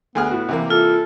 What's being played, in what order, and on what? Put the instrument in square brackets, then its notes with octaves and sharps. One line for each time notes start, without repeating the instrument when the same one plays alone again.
[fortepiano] D2 G#4 F6 [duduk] B3
[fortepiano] A2 F#4
C3 E3 A#3
[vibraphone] F4 [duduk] A4